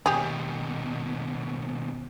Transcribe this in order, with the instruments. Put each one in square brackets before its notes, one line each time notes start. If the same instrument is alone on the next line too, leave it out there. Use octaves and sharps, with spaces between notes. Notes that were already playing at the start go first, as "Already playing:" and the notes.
[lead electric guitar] D#2 B2 [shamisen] G4 G#4